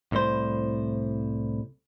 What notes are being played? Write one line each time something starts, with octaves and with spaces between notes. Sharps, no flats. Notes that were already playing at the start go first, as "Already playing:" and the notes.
C2 A2 C5